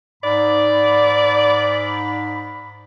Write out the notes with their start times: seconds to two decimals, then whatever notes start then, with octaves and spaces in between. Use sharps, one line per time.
0.24 G#2 D5 B5